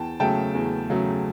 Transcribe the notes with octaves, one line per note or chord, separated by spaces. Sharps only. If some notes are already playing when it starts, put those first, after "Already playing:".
Already playing: E2 G5 A5
C#3 F#3 A3 G5 A5
E2
C#3 F#3 A3